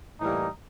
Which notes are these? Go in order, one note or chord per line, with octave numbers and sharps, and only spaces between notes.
A2 E3 G3 A#3 D#4